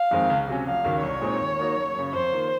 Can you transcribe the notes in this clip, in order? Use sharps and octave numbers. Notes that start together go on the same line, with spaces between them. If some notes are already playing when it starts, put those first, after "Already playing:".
Already playing: F5
F2 D#3 G#3 C4
C#2
C3 F#3 C#4
F1 F5
D#2 C#3 F#3 A#3
C2 C#5
A#2 G#3 C4 D#4
D#2
D#3 A#3 D#4 F#4
F#1
F#2 C#3
F2 C5
D#3 A#3 F4